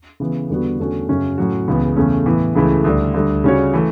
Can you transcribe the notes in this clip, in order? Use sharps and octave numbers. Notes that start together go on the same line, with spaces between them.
C#3 E3 B3
E2 D3 G3 B3 F#4
E2 D3 A3 C#4 F#4
F#2 C#3 F#3 C#4 F#4
A2 F#3 C#4 F#4
C#2 C#3 E3 B3
E2 C#3 E3 A3 C#4
A2 E3 B3 E4
C#2 C#3 E3 A3 E4
D2 D3 G3 D4
D2 D3 G3
C#3 G3 C#4 F#4 C#5
E3 A3